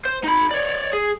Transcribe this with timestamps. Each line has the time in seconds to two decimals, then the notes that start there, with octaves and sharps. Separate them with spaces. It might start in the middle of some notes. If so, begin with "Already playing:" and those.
0.05 C5
0.24 D#4 B5
0.51 C#5 D5
0.93 G#4